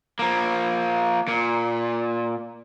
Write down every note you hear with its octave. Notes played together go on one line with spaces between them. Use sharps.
F3 A#3
A#2